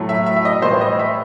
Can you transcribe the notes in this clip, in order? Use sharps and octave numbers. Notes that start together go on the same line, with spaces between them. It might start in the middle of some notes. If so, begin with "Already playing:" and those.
Already playing: A2 F#3 A3
E5
E5
E5
D#5
D#5
A2 E3 G3 C5
D#5
E5